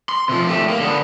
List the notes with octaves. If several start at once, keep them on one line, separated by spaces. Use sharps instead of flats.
C6
C3 F3
A3 G4
A#3
D3 B3